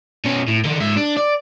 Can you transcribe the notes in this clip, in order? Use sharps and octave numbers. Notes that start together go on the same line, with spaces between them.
B2 C#4
A2
D3 D#3
G#2 E5
D4
D5